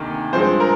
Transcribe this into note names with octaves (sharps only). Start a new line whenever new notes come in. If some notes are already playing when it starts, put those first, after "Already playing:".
Already playing: D2 C3 D#3 A#3
G2 F3 G#3 C5
A#4